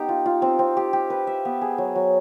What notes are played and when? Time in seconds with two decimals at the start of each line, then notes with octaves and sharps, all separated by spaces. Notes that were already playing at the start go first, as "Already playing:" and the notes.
Already playing: B3 D#4 G4
0.09 F4
0.26 F4
0.42 C4
0.59 C4
0.77 G4
0.93 G4
1.10 B4
1.27 E5
1.45 B3
1.62 G#4
1.78 F#3
1.95 F#3